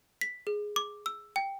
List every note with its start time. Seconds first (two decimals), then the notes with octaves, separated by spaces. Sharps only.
0.21 B6
0.47 G#4
0.76 D6
1.06 E6
1.36 G5